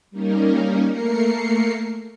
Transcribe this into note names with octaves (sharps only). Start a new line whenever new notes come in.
G3 A#3 C#4 D#4 A#4
A3 A#3 A#4 C7 C#7